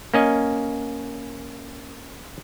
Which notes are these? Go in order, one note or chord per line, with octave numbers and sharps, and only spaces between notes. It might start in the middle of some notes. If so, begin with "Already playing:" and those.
A#3 C#4 D#5